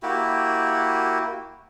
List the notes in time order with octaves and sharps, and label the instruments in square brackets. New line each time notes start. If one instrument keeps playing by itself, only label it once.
[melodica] A#3 E4 F#4 G4